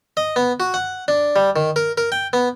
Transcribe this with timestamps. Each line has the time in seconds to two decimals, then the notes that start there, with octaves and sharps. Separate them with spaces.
0.17 D#5
0.36 B3
0.60 F#4
0.74 F#5
1.08 D4
1.36 G3
1.56 D#3
1.76 A#4
1.98 A#4
2.12 G5
2.33 B3